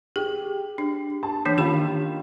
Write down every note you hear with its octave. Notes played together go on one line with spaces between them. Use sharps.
G4 G#4
D4
A5
E3 A#3 D4 C#5
D#3 C#4 F4 G4 B5